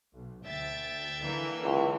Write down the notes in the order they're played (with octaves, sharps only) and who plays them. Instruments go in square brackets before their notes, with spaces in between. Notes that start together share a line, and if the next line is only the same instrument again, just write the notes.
[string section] B1
[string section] D2 A6 [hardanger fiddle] E5 G5
[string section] D3 E3 A#3
[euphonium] C#2